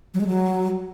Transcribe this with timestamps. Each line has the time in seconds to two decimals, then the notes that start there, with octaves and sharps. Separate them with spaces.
0.14 F#3
0.21 G#3
0.27 F#3